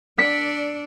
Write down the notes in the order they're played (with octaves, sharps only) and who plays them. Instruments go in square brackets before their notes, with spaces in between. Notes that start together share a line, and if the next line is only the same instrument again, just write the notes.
[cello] D4 D5 [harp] E6 B6 C#7